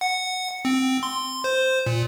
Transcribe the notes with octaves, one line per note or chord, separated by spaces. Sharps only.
F#5
C4
C6
C5
A#2